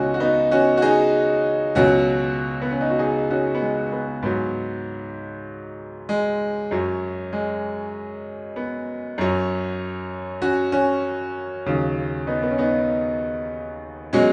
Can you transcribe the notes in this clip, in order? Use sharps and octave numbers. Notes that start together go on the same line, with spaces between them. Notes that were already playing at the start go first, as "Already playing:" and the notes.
Already playing: C#2 B2 C#4 D#4 F#4
F#4
B3 D#4
C#4 F#4
F#4
D#4 G#4
C#2 B2 F#3 C#4 F#4
B3
C#4
D#4
F#4
D#4 G#4
C#4 F#4
B3
G#3
B3
G#2 F#3 B3
G#3
F#2 F#3
G#3
B3
F#2 F#3
C#4 F#4
C#4 F#4
D#2 C#3 F#3
B3 D#4
B3
C#4
B3 D#4
B2 F#3 G#3 C#4